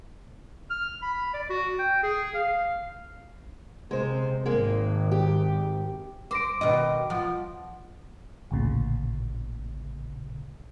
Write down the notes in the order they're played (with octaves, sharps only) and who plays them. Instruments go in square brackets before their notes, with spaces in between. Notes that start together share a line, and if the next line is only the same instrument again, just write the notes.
[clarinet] F6
B5
D5
F#4
G5
G#4
F5
[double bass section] C3 [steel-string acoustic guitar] G#3 C5
[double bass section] G#1 [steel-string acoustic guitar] G#3 A#3
[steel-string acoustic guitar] G4
[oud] C5 [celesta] D6 A#6 D7
[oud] B2 D#3 D#5
[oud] F3 [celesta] F#5
[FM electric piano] A1 D2 A#2 C#3